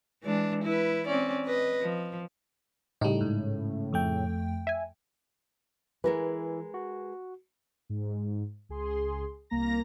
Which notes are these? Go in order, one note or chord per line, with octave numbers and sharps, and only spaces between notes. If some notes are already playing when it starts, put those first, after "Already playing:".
E3 G#3 D4
E4 B4
C4 C#4 D5
B4 D#5
F3
A2 C#3 G3 D#4
G#2
F2 A3 G5
E5 G#5
E3 G#3 A#4 B4
F#4
G#2
C#2 G#4 C6
C2 A#3 A#5 A#6